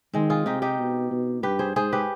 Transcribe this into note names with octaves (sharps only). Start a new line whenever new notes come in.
D#3 G#3 C4
F4 G#4
C3 D#4 G4
D#4 G4
B2
B2
G2 G4 B4
G#4 C5
G#2 G#4 C5
G4 B4